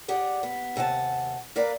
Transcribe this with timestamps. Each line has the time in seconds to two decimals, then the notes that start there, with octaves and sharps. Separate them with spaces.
0.08 G4 G#4 D5 F#5
0.43 B3
0.76 D#2 C3 F#5 G#5 A5
1.56 A#3 A#4 B4 D5 F5 A#5